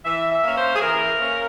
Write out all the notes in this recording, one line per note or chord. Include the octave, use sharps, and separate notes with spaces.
E3 E5
E5
A#3 C#4
C5
G#4
E3 A#4
A#3 C#4